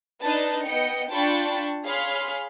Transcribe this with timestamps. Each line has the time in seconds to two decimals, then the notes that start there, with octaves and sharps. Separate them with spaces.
0.21 D4 D#4 B4 D#5 A5
0.63 B3 D#5 G5 C#7
1.10 D4 F4 G5 A5 B5 C#6
1.85 G#4 C#5 F5 B5 C6 F6